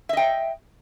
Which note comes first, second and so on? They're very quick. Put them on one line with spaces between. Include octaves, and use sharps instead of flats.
E5 D#5 G5